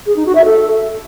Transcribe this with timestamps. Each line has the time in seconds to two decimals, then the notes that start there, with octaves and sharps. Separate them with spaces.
0.07 G#4
0.16 D#4
0.26 F#4
0.35 E5
0.45 A4